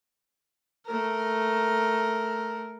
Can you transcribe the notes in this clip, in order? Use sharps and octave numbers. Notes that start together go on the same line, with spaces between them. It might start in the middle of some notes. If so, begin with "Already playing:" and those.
A3 A#4